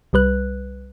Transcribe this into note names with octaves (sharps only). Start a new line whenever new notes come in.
C2 G3 B4 F#6